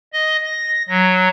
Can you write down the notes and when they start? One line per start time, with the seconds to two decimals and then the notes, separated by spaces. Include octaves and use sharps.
0.13 D#5
0.46 A#6
0.89 F#3